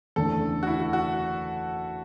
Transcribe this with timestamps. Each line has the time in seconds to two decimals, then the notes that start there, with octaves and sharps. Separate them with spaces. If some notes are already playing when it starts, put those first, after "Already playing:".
0.16 F#1 E2 D3 A3 A4
0.63 F#4
0.67 E4
0.80 F#4
0.93 F#4